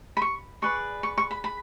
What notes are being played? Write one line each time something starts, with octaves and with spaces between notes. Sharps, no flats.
B5
C#6
G#4 B4 D5 C#6
C#6
C#6
B5
B5